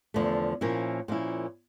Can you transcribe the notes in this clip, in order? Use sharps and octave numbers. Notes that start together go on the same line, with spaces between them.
E2 D3 F3 A3
A#2 F3 A#3 C#4 E4
A#2 F3 A#3 C#4 E4